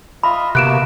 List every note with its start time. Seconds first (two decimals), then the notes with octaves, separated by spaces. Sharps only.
0.23 F4 D#5 E5 B5
0.55 C3 A#3 B3 F#4 F#6 D7 E7